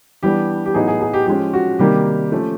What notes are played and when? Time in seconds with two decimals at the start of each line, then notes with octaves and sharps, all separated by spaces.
0.23 E3 G3 B3 D4 G4
0.66 G4
0.74 A2 F#3 B3 D#4 G#4
0.88 G#4
1.01 G#4
1.13 G4
1.27 F3 G#3 C#4 G4
1.53 F#4
1.79 C3 D#3 G3 A#3 G4
2.32 F3 A3 C#4